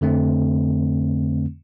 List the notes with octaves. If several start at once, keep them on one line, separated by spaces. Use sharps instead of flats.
F2 D3 A3 C4